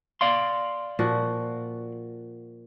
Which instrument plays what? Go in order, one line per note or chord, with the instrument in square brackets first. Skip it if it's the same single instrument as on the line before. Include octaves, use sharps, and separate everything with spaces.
[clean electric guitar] D5 F5 C6
[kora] A#2 F3 F#4